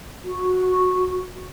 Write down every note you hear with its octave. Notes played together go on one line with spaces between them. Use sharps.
F#4